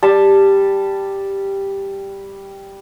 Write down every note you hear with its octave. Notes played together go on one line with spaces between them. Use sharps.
G3 A5